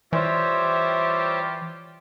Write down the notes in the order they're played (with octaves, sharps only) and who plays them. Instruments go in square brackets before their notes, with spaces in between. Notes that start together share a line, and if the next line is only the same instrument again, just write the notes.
[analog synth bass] E3 [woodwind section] G3 F4 G4 [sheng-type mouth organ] C5 C#5 E5